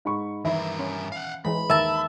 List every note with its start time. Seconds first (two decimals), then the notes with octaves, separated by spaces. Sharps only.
0.05 G#2 B5 C#6
0.45 G2 D#3 E3 E4 A#4 E5 B5
0.79 C#4
1.12 F5 F#5
1.45 E3 G#3 B5
1.70 D#2 A#4 E5 A5